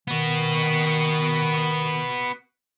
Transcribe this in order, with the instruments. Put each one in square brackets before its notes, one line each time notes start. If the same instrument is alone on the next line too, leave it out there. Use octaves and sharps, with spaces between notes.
[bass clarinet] D#3 [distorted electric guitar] B3 F#4